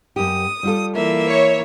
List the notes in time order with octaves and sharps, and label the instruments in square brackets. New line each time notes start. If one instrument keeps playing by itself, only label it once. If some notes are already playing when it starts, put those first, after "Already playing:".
[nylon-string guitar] F#2 G4 [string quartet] D#6
[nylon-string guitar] G3 F4 A4
[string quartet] E3 A#3 E5
[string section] C#5